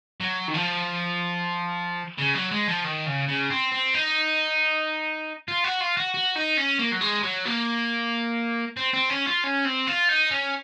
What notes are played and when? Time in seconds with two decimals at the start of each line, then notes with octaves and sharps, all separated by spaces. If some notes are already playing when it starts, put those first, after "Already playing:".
0.21 F#3
0.48 D#3
0.54 F3
2.19 C#3
2.35 F#3
2.51 G#3
2.68 F3
2.84 D#3
3.06 C#3
3.28 C#3
3.50 C4
3.72 C4
3.94 D#4
5.48 F4
5.64 F#4
5.81 F4
5.97 F#4
6.14 F#4
6.36 D#4
6.57 C#4
6.79 A#3
6.92 F#3
7.01 G#3
7.23 F#3
7.46 A#3
8.77 C4
8.93 C4
9.10 C#4
9.27 F4
9.44 C#4
9.65 C4
9.87 F4
10.09 D#4
10.31 C#4